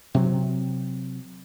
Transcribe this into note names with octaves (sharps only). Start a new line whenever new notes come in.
C3 F#3 C4